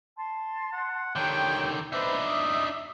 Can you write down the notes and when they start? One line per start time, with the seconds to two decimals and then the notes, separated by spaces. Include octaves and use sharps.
0.17 A5 C6
0.73 F#5
1.16 D3 D#3 G4 C#5 G5
1.92 D4 D#4 B4 C5 E5
2.26 D6 D#6